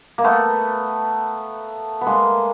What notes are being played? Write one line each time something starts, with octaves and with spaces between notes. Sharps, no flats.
A#3
A3 B3
B3
G#3 A#3